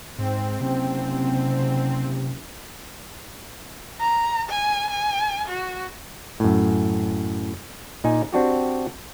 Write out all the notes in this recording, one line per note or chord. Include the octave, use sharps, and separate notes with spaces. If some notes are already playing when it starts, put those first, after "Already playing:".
G#2 C4
F#1 C3
A#5
G#5
G#5
F#4
F#2 A2
A#2 D#4 G#5
C4 D4 F#4 G4